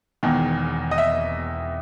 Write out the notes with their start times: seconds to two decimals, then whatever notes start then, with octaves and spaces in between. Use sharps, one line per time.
0.23 E1 E2 D#3
0.91 D#5
0.98 E5